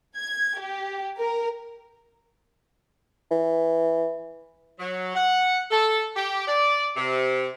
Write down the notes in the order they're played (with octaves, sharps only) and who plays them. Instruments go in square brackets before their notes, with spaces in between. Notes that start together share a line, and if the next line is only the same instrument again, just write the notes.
[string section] G#6
G4
A#4
[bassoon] E3
[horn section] F#3
F#5
A4
G4
D5
C3